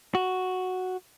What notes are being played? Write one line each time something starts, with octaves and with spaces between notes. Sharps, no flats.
F#4